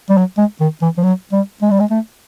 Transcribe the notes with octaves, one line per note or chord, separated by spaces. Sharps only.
G3
F#3
G#3
D#3
E3
F3
F#3
G3
G#3
G3
G#3
A3